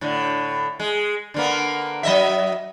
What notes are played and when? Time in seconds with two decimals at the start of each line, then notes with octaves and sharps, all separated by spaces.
0.01 A2 D3
0.80 G#3
1.34 D3 A#3 B3
2.03 F#3 D#5 E5